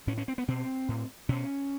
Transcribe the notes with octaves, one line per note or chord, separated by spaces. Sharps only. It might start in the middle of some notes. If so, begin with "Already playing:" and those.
A2 C#4
C#4
C4
B3
B2 C4
A2
B2 C#4